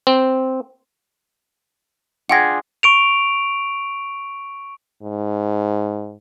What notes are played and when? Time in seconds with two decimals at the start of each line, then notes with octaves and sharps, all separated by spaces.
0.07 C4
2.29 D4 F4 G#4 F#5 G5 A#6
2.83 C#6 D7 F7
5.03 G#2